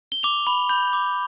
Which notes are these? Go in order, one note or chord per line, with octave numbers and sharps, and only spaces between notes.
G7
D6 F7
B5
B5 G6
D6